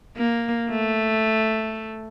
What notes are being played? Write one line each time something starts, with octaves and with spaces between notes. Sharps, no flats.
A#3
A3